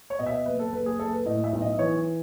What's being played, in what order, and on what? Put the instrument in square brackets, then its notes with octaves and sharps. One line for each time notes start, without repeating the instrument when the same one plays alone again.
[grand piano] C#5
B2 D#5
E5
D#5
F#1 B4
A4
F#1 B4
G#4
F#1 A4
B4
A2 D#5
E5
B1
D#5
E3 C#5